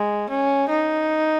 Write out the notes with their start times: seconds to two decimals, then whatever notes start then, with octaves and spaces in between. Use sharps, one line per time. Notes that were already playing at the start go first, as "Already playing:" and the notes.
Already playing: G#3
0.30 C#4
0.69 D#4